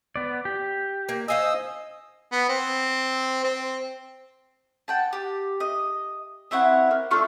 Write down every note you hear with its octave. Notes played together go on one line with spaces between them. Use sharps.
B3 D5
G4
A#3
C5 D#5 F5 G#5 D#6 E6
B3
C4
C4
F#5 G5 A5
G4
D#5
C4 E4 C#5 F#5
A#3
A3 D4 F4 C#6